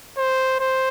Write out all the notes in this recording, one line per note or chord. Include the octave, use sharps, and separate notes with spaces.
C5
C5